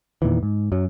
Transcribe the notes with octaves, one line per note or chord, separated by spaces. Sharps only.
E2 A#2 D#3 E3
G#2
F#2 F#3